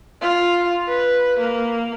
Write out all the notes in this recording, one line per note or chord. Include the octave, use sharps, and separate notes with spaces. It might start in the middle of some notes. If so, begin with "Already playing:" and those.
F4
B4
A#3